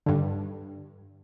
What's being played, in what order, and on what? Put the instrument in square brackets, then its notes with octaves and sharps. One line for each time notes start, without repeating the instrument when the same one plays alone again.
[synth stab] G2 D3